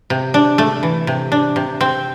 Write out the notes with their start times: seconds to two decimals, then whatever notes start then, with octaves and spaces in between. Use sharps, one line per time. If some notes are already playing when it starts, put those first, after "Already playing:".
0.10 C3
0.34 D4
0.58 A3
0.83 E3
1.07 C3
1.32 D4
1.56 C3
1.81 C4